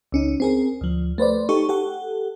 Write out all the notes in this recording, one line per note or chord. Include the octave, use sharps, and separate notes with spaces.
C#2 C#4 D#4
C4 G#4 A#4
D2 F3
A3 B4 C5 D5
D#4 G4 A4 C#6
G4 A4 F#5